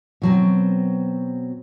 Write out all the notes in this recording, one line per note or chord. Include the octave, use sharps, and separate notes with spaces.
B2 F#3 C4